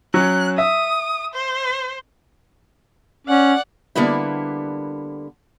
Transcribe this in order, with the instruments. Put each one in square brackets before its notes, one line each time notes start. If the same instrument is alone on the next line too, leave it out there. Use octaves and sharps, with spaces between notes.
[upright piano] F#3 C#4 [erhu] F#6
[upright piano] E5 [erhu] D#6
[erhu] C5
[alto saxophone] C#4 [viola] D5 F#5
[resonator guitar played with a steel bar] D3 G3 A#3 B3 E4